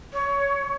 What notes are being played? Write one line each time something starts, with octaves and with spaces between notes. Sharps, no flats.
C#5